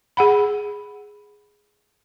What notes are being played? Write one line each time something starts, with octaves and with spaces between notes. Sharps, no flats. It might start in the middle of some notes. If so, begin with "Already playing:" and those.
G#4 F#5 B5